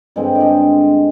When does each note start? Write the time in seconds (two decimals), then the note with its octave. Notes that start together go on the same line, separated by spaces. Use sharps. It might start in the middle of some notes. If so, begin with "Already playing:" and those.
0.16 G2 D3 G#3 C4 D#5
0.35 D5
0.40 D#5